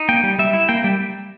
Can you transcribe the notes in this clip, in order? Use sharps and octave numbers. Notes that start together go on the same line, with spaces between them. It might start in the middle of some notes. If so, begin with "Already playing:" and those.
Already playing: D#4
A#3 G5
G3
G3 E5
E4
A#3 G5
G3